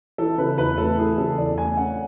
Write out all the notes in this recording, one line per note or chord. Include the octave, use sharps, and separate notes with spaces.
E3 A4
C#3 B4
E2 B4
A3 A4
E3 G#4
C#3 A4
E2 D5
A3 G#5
C#4 F#5